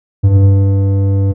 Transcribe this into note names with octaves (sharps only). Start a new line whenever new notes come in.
G2